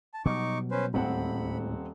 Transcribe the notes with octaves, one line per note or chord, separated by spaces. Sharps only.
A5
B2 F#3 G3 D#4 C#6 D6
C#4 B4 C5
D#1 D2 A2 G#3 C4 F#5 B5